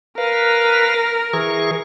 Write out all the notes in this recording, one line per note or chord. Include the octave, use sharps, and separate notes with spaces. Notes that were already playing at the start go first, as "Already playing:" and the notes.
A#4 B4 F5
E3 G#4 C#6